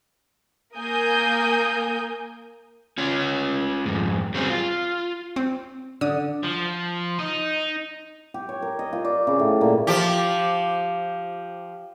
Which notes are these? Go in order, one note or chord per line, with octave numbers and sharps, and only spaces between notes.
A#3 A#4 G#5 D#6 G6
C#4 F4 C#5
F2 G#2
F#3 G3 C4 C#4 G4 G#4
F4
C4
D3 D#6
F3
D#4
G4
C#5
A#4
D#5
F4
D5
C#3
A2
A#2
F3 G4